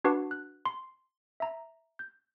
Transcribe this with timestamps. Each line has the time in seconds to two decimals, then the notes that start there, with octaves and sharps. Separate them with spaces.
0.05 D4 F#4 B4 F#5 A5 D6
0.31 F#6
0.65 C6
1.40 E5 A#5
1.99 G6